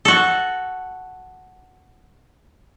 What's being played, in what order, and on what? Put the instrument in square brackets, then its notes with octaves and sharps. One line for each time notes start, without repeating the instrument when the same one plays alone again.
[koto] F#4 A4